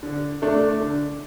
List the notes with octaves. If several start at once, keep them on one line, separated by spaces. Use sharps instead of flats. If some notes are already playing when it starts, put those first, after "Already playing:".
D3
A3 D4
D3